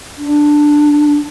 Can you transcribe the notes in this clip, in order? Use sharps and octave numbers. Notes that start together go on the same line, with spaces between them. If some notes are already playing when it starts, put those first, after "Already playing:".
D4